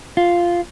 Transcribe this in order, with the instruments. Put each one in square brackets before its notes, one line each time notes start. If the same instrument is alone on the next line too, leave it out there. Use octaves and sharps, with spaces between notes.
[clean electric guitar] F4